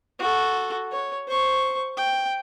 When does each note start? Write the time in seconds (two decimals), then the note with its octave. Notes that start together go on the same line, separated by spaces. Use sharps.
0.20 F#4 A4
0.92 C#5
1.28 C5 C#6
1.98 G5